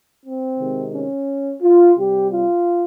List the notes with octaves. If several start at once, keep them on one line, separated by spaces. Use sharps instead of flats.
C4
C3 D#3 G#3
C#4
F4
C3 G3 G4
F4